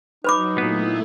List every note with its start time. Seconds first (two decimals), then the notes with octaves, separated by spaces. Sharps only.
0.24 F#3 D#4 B4 B5 D6
0.58 A#2 A3 B3 E4